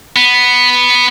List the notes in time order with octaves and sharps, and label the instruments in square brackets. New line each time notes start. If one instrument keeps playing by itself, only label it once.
[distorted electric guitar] B3